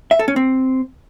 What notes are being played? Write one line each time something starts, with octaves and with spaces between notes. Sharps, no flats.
E5
A4
C#4
C4